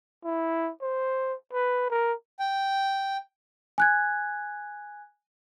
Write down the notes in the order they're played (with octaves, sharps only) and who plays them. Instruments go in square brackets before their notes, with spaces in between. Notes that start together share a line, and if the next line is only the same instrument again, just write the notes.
[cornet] E4
C5
B4
A#4
[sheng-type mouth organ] G5
[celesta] G#5 F#6 G#6